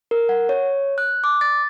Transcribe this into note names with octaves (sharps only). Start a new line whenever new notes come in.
A#4
F#5
C#5
F#6
D6
A6